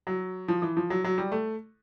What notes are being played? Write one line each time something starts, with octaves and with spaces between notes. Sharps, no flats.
F#3
F3
E3
F3
F#3
F#3
G3
A3